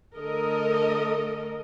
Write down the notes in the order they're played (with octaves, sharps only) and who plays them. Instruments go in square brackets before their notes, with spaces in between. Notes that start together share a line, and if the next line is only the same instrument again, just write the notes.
[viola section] D3 A3 A4 A#4 D#5